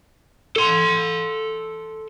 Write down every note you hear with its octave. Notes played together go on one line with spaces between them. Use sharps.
A4 C6